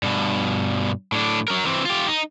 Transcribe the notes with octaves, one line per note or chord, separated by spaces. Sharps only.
G2 B2
A2 D4
F#3 A#4
E3 C4
F4 G4
D#4